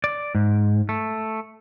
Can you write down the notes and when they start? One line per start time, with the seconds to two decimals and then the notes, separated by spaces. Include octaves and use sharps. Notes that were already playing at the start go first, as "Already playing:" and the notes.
0.04 D5
0.35 G#2
0.89 A3